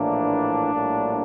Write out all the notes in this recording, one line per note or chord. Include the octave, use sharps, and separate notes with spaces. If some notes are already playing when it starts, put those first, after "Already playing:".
Already playing: A#1 A2 E3 A#3 D4
A#1 A2 G3 A#3